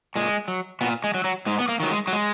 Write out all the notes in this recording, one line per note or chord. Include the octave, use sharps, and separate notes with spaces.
A#2 G#3
F#3
A#2 B3
G#3
F#3
F#3
G#2 G#3
B3
A#3
D#3 F#3
G#3
F#3
G#3